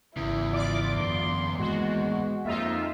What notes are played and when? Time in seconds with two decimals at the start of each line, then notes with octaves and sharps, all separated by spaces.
0.17 G#1 E2 C#3 E4
0.52 F4 D5 D6
0.95 F#2 D3 C6
1.59 A2 D#3 G#3 A#3 F#4
2.46 F2 A#3 D#4 F4 E5